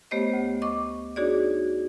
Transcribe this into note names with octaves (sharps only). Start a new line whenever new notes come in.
A3 B3 G4 C5 C#5 D#5
D2
D#5 C#6 D6
D4 D#4 F#4 G#4 C#5 D5